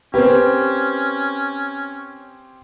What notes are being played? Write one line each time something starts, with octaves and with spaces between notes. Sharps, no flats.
C4 C#4 G4 A#4 B4